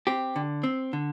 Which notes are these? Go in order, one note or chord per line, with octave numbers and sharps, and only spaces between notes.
C4 G4
D3
C4
D3